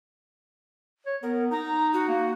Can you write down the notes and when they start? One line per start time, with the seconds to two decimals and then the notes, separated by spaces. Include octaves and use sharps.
1.06 C#5
1.23 B3 A#4
1.51 D#4 A#5
1.93 F#4
2.08 A#3